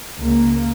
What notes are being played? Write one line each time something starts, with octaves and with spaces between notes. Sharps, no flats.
C#2 C#3 A#3